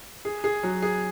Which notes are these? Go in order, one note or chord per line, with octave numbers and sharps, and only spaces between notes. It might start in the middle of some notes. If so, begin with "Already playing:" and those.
G#4
G#4
F#3
G#4